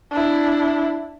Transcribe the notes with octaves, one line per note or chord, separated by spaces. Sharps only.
D4 E4